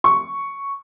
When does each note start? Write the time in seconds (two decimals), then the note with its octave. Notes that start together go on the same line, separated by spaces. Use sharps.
0.04 C#6